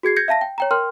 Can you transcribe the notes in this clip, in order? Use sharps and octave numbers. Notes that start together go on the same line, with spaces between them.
F#4 G#4 G#6 C7
G6 G#6 A#6 C#7
E5 F5 A5 A#6
G5
C#5 G5 A#5
A#4 G5 C6 F6